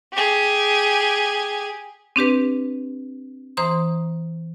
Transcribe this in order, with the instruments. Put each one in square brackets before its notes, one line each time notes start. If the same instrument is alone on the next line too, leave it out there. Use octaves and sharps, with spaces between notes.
[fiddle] G4 G#4
[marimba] C4 D4 G4 B4
E3 C5 A#5 C6 D#6